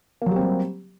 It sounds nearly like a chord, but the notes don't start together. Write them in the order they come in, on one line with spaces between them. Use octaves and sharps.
A#3 F#3 G4 C4 G3